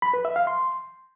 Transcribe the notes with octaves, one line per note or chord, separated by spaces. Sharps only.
B5
B4
E5
F5
C6